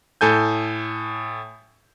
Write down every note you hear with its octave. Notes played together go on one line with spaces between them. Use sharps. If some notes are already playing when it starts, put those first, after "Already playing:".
A2 A4 G#5 G6